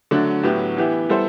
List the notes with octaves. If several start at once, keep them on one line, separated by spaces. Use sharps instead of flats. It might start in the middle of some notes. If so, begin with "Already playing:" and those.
D3 F#3 A3 D4
A2 F#3 B3 E4 G4
E3 B3 E4 G4
G3 B3 E4 A4 C5